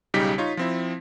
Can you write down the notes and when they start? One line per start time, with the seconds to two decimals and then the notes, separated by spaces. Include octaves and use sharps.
0.14 B1 C#3 G3 D#4 G4 B6
0.38 D#4 F4 C#5
0.57 F3 C4 E4